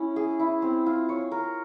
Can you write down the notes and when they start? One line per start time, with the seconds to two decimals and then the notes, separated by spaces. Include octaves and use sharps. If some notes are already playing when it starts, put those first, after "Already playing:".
Already playing: C#4 E4
0.16 G#4
0.40 E4
0.62 C4
0.86 F4
1.09 C#5
1.31 A#4